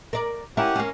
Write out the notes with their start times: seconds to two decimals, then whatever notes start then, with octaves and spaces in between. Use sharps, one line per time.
0.13 A#4 D5
0.57 C#4 E4 G4 A#4 F#5
0.76 A#3 C#4